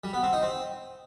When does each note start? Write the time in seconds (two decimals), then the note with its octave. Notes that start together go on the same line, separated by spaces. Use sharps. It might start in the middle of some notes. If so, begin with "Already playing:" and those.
0.04 G3
0.13 B3
0.23 C4
0.33 D#4
0.43 C4